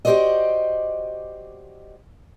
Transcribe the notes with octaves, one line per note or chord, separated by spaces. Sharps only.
F#4 G4 A#4 C5 D5 D#5